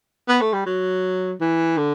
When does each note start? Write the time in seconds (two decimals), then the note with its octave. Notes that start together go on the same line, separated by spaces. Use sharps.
0.28 B3
0.41 A3
0.53 G3
0.66 F#3
1.40 E3
1.77 D3